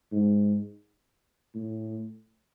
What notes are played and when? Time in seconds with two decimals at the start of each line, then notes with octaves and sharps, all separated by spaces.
0.12 G#2
1.55 A2